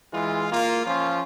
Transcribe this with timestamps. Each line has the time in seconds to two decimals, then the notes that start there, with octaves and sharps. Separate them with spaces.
0.13 E3 G#3 F4
0.51 A#3 F4
0.85 F3 C#4 F4